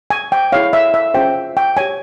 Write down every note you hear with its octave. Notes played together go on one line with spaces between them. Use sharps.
G#5
G5
E4 G#4 C#5 F5
E5
E5
C#4 F4 G#4 C5 G5
G5
G4 C#5 G#5